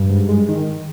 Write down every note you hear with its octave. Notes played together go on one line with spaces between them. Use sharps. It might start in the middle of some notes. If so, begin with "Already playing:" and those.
Already playing: G2
G#2
G#3
D#3